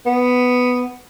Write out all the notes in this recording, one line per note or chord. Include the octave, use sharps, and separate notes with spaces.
B3